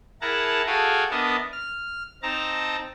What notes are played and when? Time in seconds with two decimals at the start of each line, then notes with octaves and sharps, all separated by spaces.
0.21 E4 G#4 A#4 F#5 A5 A#5
0.67 F#4 G#4 A4 F5 G5 G#5
1.11 B3 D4 A#4 D#5 E5 A5
1.53 F6
2.23 C4 D#4 A5 A#5